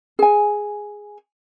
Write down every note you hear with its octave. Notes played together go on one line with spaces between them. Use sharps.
G#4 G#5